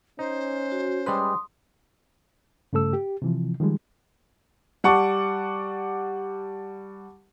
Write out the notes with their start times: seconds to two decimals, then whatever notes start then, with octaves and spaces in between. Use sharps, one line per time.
0.19 C#4 D#4 C5
0.72 F#4
1.06 G3 G#3 B4 C6 D#6
2.73 G2 C#3 A3 A4 E6
2.93 G4
3.22 C3 E3 F3
3.60 D#3 F3 G3 G#3
4.84 G3 F#5 A5 C#6 D6